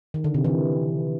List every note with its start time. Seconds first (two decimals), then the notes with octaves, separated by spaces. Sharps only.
0.14 D#3
0.24 D3
0.34 C3
0.44 E3